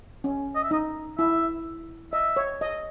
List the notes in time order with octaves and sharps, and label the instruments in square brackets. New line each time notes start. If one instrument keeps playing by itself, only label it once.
[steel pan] C#4
[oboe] D#5
E5
[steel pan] D#4 [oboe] D#5
[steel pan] E4 [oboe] E5
[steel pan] D#5 [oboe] E5
[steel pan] C#5
D#5